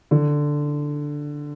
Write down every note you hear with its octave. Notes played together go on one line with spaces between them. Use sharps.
D3